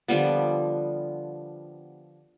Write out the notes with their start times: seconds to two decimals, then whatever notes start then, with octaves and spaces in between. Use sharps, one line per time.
0.08 D3 F3 G3 B3